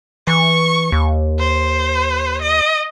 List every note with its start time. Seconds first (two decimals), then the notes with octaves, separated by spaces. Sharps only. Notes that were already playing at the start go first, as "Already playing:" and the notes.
0.27 E3 C#6
0.92 D#2
1.39 C5
2.42 D#5